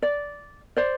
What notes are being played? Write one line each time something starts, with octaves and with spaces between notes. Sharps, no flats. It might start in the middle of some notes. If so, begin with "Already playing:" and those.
D5
C5 D5